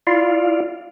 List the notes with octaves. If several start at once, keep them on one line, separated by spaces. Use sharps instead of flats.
E4 F4 D5 F5